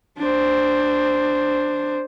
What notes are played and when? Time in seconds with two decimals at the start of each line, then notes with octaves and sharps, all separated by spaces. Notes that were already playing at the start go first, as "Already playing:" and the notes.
0.18 D4 C5